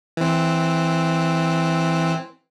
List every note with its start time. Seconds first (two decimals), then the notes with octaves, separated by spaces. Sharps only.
0.17 E3 C4